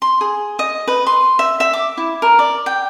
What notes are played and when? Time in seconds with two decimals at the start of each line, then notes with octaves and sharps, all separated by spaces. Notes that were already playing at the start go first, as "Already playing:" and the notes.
0.02 C6
0.21 G#4
0.59 D#5
0.88 B4
1.07 C6
1.39 E5
1.60 E5
1.73 D6
1.97 E4
2.22 A#4
2.39 D5
2.66 G5